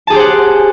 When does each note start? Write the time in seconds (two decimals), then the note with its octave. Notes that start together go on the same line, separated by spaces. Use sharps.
0.07 A5
0.10 G#4
0.13 G4
0.16 C5
0.19 F#5